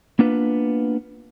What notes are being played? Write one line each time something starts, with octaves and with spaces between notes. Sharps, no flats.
A#3 B3 D4 F4 B4